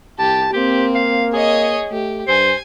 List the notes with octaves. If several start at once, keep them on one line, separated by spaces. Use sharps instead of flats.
C2 G4 A5
A#3 C4 G4
F5
G#4 C#5 D#5
A3 G4
G2 C5 G#5